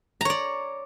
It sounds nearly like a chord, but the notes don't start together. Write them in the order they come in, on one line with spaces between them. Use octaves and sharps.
A#5 C#5 D5